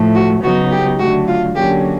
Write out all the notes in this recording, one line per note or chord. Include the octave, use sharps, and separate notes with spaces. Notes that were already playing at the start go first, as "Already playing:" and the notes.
Already playing: A2 F3 A3
F#4
C#3 F#3 B3 D#4 F#4
G4
D3 F#3 A3 F#4
F4
D3 F#3 A#3 C#4 G4